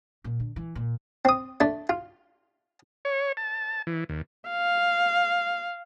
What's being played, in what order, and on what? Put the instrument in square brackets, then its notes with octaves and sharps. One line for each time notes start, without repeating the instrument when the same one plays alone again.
[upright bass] A#2
D3
E3
A#2
[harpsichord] C4 D#6
A3 D4
F4
[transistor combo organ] C#5
A5
E3
D#2
[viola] F5